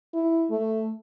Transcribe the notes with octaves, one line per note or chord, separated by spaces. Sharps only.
E4
A3